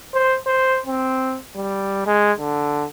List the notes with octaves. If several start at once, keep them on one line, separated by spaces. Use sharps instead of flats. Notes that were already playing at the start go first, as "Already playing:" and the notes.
C5
C5
C4
G3
G#3
D3